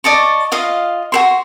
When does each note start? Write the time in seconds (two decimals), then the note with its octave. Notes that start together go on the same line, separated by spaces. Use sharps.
0.04 D5 D#5 A5 C#6
0.52 F4 D#5 F5
1.12 F#4 A4 C6